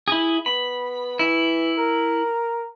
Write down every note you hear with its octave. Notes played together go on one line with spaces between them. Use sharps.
E4 G#4
B3 B5
E3 E4
A#4